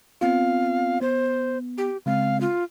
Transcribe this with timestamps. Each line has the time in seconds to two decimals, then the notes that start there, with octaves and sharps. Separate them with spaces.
0.21 B3 C4 F4 F5
1.01 B3 C5
1.78 G4
2.06 C#3 G#3 C4 F5
2.41 F4